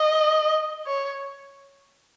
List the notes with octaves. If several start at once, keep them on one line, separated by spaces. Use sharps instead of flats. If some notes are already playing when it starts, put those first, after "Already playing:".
Already playing: D#5
C#5